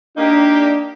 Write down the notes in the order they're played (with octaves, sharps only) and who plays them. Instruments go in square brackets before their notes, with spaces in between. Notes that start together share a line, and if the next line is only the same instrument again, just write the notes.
[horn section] A#3 D#4 G4 [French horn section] D4